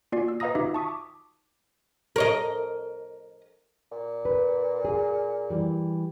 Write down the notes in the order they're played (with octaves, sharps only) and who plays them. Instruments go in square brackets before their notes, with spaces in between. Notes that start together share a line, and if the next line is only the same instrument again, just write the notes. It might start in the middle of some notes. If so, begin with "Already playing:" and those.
[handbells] A#3 F4 F#4 D5 G#5 C7
E6
B4 D#5 F5 A#5 D#6 A#6
D#4 F4 F#4 B4 E5 D6
A5 C#6 D#6 B6
D6
[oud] A#4 C#5 D#5
[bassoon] A#2
[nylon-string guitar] B4
G#4
E3 G3